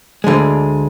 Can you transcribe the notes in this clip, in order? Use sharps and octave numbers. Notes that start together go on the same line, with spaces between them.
D2 D3 G#3